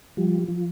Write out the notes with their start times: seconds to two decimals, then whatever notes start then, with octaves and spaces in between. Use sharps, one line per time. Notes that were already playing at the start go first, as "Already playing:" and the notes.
0.17 F3 G3
0.48 F3